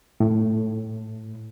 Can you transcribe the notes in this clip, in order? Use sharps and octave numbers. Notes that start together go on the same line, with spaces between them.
A2